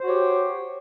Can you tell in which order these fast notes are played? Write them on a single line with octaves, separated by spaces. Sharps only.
C5 F#4 C#5 G4